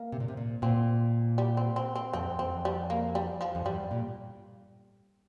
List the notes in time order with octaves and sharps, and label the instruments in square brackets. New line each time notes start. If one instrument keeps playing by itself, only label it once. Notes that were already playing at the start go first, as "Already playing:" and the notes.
Already playing: [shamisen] A#3
[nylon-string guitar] C3
A#2
C3
A#2
[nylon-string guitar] A#2 [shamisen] C4
[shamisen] G3
C4
C4
C4
[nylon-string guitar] F2 [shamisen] C4
[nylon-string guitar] F2 [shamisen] C4
[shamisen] G3
A#3
G3
F3
[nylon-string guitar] F2
[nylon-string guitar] G2 [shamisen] G3
[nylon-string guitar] A#2